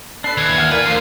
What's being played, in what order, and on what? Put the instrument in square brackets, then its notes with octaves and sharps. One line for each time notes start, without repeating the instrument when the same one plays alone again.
[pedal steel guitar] D4 A4 B4 [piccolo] C7
[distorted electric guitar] D#2 [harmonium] E3 [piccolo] G#6
[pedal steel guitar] F#5 F6
[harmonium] A#4 F5 [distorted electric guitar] B4 [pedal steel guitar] D5
[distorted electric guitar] D2 [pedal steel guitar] D3 F3 C5 [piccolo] C7